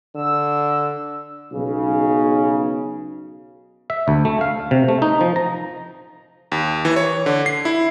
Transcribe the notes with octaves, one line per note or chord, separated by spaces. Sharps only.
D3 E6
B1 C#3
E5
D2
A3
F5
C3
A3
D#4
F3
A#5
D#2
E3
C#5
D3
C7
E4